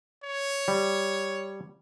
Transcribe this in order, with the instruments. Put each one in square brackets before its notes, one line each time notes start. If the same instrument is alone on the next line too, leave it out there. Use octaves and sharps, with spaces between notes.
[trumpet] C#5
[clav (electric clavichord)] G3